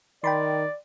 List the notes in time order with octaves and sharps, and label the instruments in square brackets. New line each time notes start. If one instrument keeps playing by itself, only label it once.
[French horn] D#3 [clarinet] D5 [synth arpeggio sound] G5 B5 C6